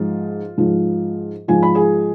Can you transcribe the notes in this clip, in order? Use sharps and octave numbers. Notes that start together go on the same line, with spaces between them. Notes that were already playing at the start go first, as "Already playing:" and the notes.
Already playing: G#2 F3 F4
G#2 F3
G#2 F3 G#5
B5
G#4 G#5